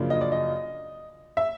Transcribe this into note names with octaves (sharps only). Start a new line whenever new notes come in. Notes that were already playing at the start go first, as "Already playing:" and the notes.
Already playing: F#2 C#3 F3 A#3 D4
D#5
D5
D#5
E5